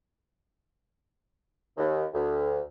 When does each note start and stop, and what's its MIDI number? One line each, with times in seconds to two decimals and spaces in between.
1.77 2.04 39
2.13 2.59 38